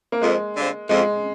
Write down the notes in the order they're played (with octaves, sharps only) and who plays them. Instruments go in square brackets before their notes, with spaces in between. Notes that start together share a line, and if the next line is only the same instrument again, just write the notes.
[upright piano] A#3
[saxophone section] F2 [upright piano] G#3
[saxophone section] D3 G3 C4 F4
[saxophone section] F2 [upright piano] G#3